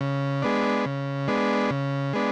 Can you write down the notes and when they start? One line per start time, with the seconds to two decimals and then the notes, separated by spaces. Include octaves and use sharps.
0.01 C#3
0.42 G#3 B3 D4
0.85 C#3
1.28 G#3 B3 D4
1.70 C#3
2.13 G#3 B3 D4